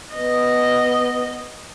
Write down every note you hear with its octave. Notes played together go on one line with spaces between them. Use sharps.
B3 D#5